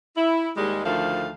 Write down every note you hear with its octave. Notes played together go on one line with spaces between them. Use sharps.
E4
D#2 G3 G#3
D2 D#3 F3 A3 F5